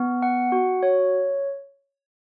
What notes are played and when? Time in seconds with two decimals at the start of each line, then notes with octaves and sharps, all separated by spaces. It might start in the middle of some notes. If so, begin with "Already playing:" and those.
Already playing: B3
0.22 F#5
0.52 F#4
0.83 C#5